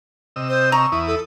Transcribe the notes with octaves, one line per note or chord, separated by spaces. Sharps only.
C3 D#5 E6
C5
A#5 C#6
E2 E4 D#6
A4